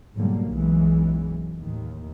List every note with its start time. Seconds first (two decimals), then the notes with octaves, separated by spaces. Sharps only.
0.16 G#2 B2 D3 F#3 G3 A#3
0.50 B1 F#2 E3 F#3 G#3
1.59 D#2 A2 D#3